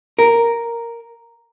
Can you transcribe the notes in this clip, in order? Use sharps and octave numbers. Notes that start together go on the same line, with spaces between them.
A#4